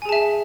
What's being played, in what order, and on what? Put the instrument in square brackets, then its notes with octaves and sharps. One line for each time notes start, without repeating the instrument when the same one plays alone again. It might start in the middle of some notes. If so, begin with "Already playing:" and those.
[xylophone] G#5
G#4
A5
E5